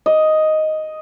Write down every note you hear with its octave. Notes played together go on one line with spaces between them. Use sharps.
D#5